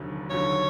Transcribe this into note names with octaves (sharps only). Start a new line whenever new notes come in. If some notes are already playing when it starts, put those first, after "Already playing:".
Already playing: F1 D#2 D3 F#3
F1 D#2 D3 F#3 C#5